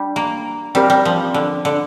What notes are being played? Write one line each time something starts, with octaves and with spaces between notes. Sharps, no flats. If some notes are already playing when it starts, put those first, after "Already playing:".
Already playing: G3 D4
A#3
G3 C4 G4 A#4
G3
F3
D3
D3